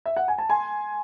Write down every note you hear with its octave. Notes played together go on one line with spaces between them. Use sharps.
E5
F#5
G#5
A5
G#5 C6